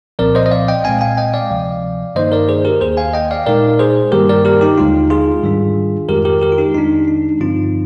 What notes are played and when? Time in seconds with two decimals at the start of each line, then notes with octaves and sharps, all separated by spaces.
0.19 C2 A#2 F3 C4 A#4 D5
0.35 C5 D#5
0.46 D#5
0.51 D5 F5
0.68 D#5 G5
0.84 A#2 G#3 C4 F5 G#5
1.01 F5 G#5
1.17 D#5 G5
1.34 D5 F5
1.50 D2 C3 F3
2.15 G2 D#3 A#3 D#4 C5 D#5
2.32 A#4 D5
2.49 G#4 C5
2.65 G4 A#4
2.81 D#2 D#3 A#3 G#4 C5
2.97 F5 G#5
3.14 D#5 G5
3.31 D5 F5
3.46 A#2 G#3 D#4 A#4 D5
3.79 G#4 C5
4.12 G2 D#3 G3 A#3 G4 A#4
4.29 A#4 D5
4.45 G4 A#4
4.61 D#4 G4
4.78 D#2 D3 G#3 D#4 F4
5.10 F4 G#4
5.43 G#2 D#3 G3 D4
6.09 F2 D#3 G#3 G4 A#4
6.25 G4 A#4
6.41 G4 A#4
6.52 F4
6.58 D#4 G4
6.74 F2 D#3 G#3 D4 D#4
7.08 D#4
7.40 G2 D3 F3 C4 D#4 F4